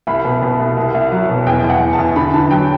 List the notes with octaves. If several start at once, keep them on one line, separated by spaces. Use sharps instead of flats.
C2 B5
B2
B2
C2
C2
C2
F#3
B2
E2 G5
E2
F#5
E2
A5
E2
D3 B5
D3 A5
F#3 G5